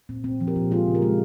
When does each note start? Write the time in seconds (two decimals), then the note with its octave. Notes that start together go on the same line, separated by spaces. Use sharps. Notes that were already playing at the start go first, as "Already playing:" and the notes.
0.09 A#2 C4
0.24 A#2 C4
0.41 F3
0.47 G4 A#4
0.56 A#2
0.71 G#3 F4 G#4
0.87 C#3
0.94 G4 A#4
1.02 G#3